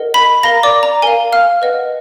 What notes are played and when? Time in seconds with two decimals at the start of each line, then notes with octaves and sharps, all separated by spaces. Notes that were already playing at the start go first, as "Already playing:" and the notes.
Already playing: A#4 D#5 F#5
0.14 B5 B6
0.43 A#4 F5 A#5 A#6
0.63 D5 D6
0.83 A#5
1.02 A#4 F5 G#5
1.32 F5 F6
1.62 B4 D#5 F#5